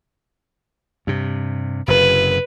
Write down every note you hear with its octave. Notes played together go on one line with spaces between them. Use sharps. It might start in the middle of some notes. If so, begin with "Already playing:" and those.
G2 C3
F#1 F#2 C3 B4